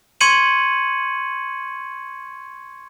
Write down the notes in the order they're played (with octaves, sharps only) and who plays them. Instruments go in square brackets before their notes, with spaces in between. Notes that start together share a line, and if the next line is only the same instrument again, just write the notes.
[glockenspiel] C6 C#6 G#6 C#7 D#7 F#7